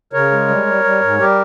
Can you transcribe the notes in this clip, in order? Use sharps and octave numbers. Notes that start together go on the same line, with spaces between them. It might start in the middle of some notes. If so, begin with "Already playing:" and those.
C#3 A#4 C#5
G#3
G3
G3
G3
G#2
G3 G4 A#4